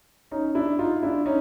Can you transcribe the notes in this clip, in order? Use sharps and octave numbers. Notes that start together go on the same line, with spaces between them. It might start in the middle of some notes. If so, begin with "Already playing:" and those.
C#4 D#4
D4 E4
D#4 F4
D4 E4
C#4 D#4